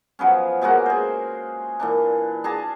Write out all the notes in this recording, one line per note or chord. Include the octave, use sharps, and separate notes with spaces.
F3 F#3 B3 C#4
B2 G#3 A#3 F#4
G#4 C5
A#2 E3 D4
D4 G#4 A5 A#5